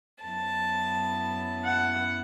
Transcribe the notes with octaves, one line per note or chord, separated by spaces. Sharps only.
F#2 F#3 B3 E4 A5
F#5